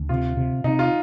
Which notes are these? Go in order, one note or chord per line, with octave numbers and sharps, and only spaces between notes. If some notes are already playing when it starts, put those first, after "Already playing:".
Already playing: D2
C3 F4
C3
C3 D#4
F4